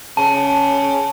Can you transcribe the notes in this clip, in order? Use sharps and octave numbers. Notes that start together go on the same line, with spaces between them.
C#3 A5